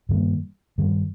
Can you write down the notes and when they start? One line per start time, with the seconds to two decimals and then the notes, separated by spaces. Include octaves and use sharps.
0.09 G2 D#3 G3 A#3
0.78 G2 D#3 G3